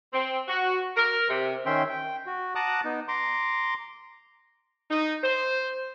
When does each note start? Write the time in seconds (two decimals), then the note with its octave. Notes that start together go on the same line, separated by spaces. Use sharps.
0.13 C4
0.48 F#4
0.96 A#4
1.29 C3
1.66 D#3 C#4 E5 G5 C6
1.89 G5
2.27 F#4
2.55 F#5 A5 A#5 D6 D#6 F#6
2.85 B3 D#4
3.08 A#5 C6 D6
4.91 D#4
5.24 C5